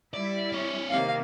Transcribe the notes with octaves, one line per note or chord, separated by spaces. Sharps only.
G3 E4 D5
C4 C#5
C3 D#3 A#3 F5